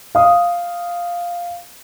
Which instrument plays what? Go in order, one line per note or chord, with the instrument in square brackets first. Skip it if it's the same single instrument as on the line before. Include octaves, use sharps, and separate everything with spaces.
[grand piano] F5 D#6